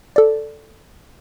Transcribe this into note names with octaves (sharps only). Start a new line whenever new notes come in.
A4 D5